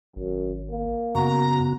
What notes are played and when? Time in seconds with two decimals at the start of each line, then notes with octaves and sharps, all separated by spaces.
0.16 G#1 F#2
0.71 A#3
1.15 F#2 C#3 B3 F#4 A#5